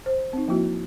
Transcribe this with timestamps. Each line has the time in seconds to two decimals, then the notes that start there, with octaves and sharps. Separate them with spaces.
0.06 C5
0.33 C4 D#4
0.48 F3 A#3 E4 F#4